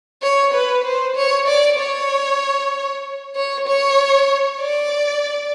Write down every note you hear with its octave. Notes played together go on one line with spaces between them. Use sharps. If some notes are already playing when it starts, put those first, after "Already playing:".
C#5
B4
C5
C#5
D5
C#5
C#5
C#5
D5